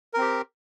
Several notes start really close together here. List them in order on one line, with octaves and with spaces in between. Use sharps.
A#4 C4 G4